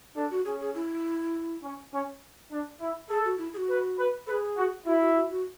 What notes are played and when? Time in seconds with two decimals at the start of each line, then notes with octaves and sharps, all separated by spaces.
0.16 D4 A4
0.31 F#4
0.45 C#4 G#4
0.60 G#4
0.75 E4
1.63 C#4
1.92 C#4
2.50 D4
2.80 E4
3.09 G#4 A4
3.25 F#4
3.38 E4
3.54 G#4
3.57 F#4
3.68 B4
3.97 B4
4.26 A4 B4
4.31 G#4
4.56 F#4
4.85 E4 F#4
5.00 F#4
5.15 F#4
5.30 F#4